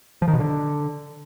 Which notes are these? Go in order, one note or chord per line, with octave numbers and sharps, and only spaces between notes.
F3
D#3
B2
D3